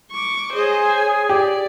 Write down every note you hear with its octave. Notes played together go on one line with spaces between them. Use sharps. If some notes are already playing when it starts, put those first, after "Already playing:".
C#6 D6
G#4 C5 C#5 D#5
G#5
G4 D5